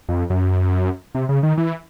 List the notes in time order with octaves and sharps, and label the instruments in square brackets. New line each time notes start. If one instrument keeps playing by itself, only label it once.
[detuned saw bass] F2
F#2
C3
C#3
D#3
E3